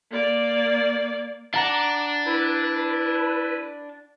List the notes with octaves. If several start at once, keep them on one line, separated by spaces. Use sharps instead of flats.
A#3 D5
D4 F#5 A#5 D6
E4 B4